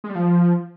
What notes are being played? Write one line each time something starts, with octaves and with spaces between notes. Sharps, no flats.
G#3
G3
F3